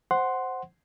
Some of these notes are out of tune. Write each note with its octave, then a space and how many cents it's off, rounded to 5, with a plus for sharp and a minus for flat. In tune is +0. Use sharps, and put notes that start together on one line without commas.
C5 +0 F#5 +5 C6 +0